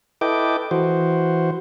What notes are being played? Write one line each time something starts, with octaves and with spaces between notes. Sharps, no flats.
E4 A4 B4 D#5 G5 D6
E3 F#4 C5